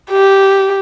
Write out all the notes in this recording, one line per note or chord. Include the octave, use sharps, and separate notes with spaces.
G4